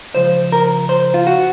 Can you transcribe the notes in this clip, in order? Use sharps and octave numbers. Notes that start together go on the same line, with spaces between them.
C#2 C#3 F3 C5
A#4
C5
F4
F#4